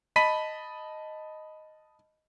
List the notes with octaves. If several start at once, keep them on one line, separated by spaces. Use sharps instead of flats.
D#5 A5 B5 B6 D#7